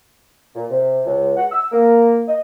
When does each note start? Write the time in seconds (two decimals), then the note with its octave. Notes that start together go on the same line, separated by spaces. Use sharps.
0.55 A#2
0.71 C3
1.06 C#2
1.37 F#5
1.52 E6
1.72 A#3
2.28 D#5